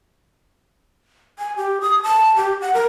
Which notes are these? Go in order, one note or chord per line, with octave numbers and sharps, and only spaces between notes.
G#5
G4
D#6
A5
G4
F#5
A#4